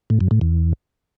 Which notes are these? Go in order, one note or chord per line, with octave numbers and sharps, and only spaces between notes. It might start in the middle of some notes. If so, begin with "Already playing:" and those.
A2
F#2
A2
E2